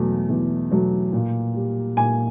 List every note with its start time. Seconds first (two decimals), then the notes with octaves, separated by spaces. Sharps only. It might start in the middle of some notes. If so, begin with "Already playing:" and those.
Already playing: E2 B2 F#3 A3
0.29 E2
0.71 B2 F#3 A3
1.13 A#2
1.54 G3
1.96 A#2 G#5